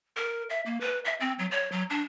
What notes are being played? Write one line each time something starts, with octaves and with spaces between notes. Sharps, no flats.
A#4
E5
A#3
B4
E5
C4
F#3
C#5
F#3
D4